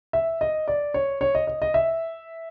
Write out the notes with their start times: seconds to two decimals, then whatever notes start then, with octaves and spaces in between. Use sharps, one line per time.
0.13 E5
0.41 D#5
0.68 D5
0.94 C#5
1.21 C#5
1.35 D#5
1.47 D#5
1.62 D#5
1.74 E5